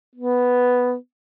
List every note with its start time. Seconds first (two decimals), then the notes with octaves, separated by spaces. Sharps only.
0.15 B3